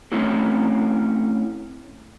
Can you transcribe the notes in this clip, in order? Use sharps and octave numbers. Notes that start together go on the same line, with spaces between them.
A3 C4 C#4 E4 G4